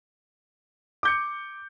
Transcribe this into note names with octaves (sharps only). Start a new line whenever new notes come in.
D6 G6 C#7